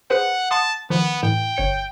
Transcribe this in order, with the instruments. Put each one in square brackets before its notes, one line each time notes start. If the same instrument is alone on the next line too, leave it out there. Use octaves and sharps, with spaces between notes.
[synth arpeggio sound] G#4 B4 C5 [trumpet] F#5
[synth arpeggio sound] F#5 C6 D#6 [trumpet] A5
[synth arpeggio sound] D#3 F3 [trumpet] B3
[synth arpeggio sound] A2 E3 [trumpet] G5
[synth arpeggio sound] G1 C#5 C#7